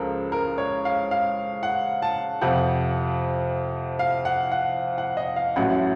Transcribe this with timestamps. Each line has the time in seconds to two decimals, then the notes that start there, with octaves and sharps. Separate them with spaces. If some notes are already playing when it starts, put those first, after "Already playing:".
Already playing: C#2 C#3 F3 A4 A#4
0.32 A#4
0.58 C#5
0.85 F5
1.11 F5
1.63 F#5
2.02 A5
2.42 F2 C3 F3 F#5
3.99 F5
4.25 F#5
4.52 F#5
4.98 F#5
5.17 D#5
5.36 F5
5.56 A1 A2 F#3 F#5